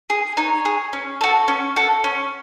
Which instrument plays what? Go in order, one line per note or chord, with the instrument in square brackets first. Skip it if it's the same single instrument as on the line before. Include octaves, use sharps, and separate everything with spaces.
[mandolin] G#4
D#4 C#5
G#4
C#4
F#4 A4
C#4
F#4 A4
C#4